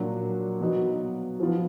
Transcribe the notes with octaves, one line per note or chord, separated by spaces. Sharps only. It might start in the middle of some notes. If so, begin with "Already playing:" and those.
Already playing: A#2 F#3 D4 F#4
B2 F#3 B3 D#4 F#4
F3 B3 F4